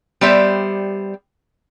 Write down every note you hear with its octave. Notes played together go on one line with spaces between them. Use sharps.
G3 B3 G4 C5 D5 E5